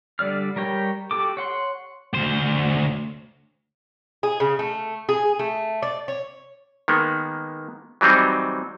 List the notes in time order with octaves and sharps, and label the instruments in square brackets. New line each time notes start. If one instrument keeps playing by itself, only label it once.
[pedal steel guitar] D3 G3 D5 F6
G3 A#4 C#5 G5
F#4 G4 A4 D6
C#5 F#5 C6
[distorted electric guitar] D2 C5
[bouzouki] G#4
C#3
A3
G#4
A3
D5
C#5
[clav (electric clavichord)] D#3 G#3 A#3 B3
E3 F#3 G3 C4 D#4